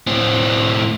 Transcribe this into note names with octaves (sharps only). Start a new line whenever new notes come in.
A2 C4